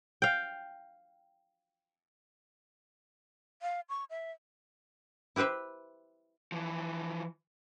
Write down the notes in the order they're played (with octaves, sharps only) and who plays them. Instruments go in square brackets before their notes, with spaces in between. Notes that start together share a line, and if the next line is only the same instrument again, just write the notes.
[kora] F5 G5
[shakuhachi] F5
C#6
E5
[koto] E4 G4 B4 C5 E5
[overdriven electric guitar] E3 F3